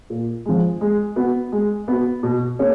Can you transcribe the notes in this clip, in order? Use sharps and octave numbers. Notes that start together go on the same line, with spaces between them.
A#2
F3 G#3
G#3
B3 F#4
G#3
B3 F#4
B2
A#3 C#4 G#4 C#5